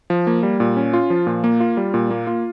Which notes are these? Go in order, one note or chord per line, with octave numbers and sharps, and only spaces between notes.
F3
A#3
G3
A#2
C#4
F4
F3
A#2
A#3
F4
G3
A#2
A#3
F4